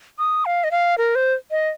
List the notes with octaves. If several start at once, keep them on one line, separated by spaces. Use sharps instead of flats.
D#6
F5
D#5
F5
A#4
C5
D#5